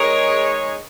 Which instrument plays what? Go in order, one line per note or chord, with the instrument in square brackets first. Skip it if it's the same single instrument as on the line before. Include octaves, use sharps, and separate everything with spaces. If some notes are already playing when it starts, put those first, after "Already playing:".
Already playing: [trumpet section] G#3 D#4 G#4 C#5 [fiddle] A#4